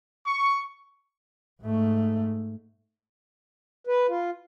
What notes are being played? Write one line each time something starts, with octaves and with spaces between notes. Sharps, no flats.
C#6
G#2 A3
B4
F4